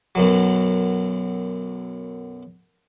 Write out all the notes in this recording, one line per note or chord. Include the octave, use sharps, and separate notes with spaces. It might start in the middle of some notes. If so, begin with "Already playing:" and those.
B1 F#2 F#3